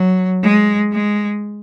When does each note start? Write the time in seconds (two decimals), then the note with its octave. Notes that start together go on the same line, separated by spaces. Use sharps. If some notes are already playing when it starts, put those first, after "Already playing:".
Already playing: F#3
0.43 G#3
0.92 G#3